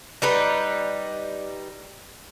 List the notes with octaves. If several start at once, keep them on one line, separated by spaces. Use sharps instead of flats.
G3 D#4 B4